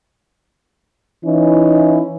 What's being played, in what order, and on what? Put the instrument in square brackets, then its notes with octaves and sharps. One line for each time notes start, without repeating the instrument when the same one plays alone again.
[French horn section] E3 C#4 D#4 E4